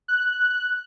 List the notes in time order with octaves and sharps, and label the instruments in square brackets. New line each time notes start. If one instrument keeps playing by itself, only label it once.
[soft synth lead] F#6